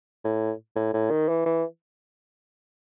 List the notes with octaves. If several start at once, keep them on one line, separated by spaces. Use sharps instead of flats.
A2
A2
A2
D#3
E3
E3